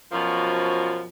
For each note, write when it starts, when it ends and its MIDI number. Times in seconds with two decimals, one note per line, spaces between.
0.12 1.07 42
0.12 1.07 47
0.12 1.07 53